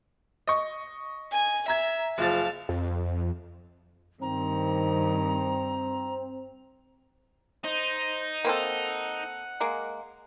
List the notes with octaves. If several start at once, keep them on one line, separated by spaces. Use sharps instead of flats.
D#5 C#6
G#5
E5 A#5 G#6
F#1 F3 F5 A5 A6
F2
G2 D#3 C4 A#5
D#4 C5
A#3 C4 A4 F#5
G#3 A#3